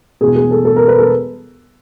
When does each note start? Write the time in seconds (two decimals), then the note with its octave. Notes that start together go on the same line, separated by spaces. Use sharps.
0.21 E1 E2 B2 G#4
0.36 G#4
0.51 A4
0.65 A4
0.76 A#4
0.88 B4
0.98 A4